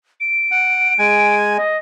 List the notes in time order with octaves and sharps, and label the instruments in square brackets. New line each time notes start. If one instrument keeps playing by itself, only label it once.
[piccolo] D7
[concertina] F#5
G#3 G#5
[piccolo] G#6
D#5